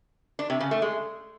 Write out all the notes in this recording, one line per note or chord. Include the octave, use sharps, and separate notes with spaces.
D4
C3
C#3
A3
G#3